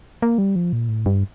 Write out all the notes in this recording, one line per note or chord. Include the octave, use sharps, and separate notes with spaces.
A#3
G3
F3
A#2
A2
G2